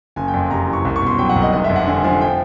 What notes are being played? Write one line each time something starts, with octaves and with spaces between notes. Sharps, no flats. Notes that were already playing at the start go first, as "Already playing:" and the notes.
F#1 G#5
G5
F2
G5
C3 A#5
E3
C#6
C2
C#6
B2 C6
F#3 G5
F#5
C2
D#5
F1 D#5
E5
F2
F#5
D3 G#5
F3 G#5
G5